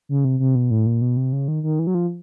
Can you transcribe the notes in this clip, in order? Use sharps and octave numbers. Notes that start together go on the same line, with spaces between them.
C#3
C3
C3
B2
A2
A#2
B2
C3
C#3
D#3
D#3
E3
F#3
F3